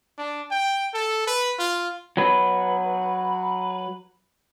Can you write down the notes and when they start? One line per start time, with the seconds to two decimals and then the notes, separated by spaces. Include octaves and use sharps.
0.18 D4
0.51 G5
0.94 A4
1.27 B4
1.59 F4
2.17 F#3 B4